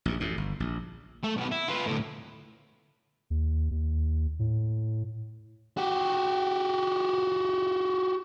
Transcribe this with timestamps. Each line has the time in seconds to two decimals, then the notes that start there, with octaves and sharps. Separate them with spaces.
0.06 A#1 G2
0.20 A1 F#2 A2
0.38 G1
0.60 A#1
1.24 A3
1.37 B1 B3
1.52 E4
1.68 F4 B4
1.86 D2 A2
3.30 D#2
3.71 D#2
4.39 A2
5.77 F#4 G4